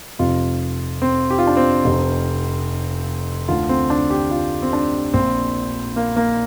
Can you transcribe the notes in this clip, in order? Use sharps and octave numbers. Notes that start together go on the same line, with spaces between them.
F1 F2 C3 F4
C4
G4
F4
D4
C4
F1 F2 C3
D2 D3 F4
C4
D4
G4
F4
C4
D4
A#1 A#2 C4
A#3
A#3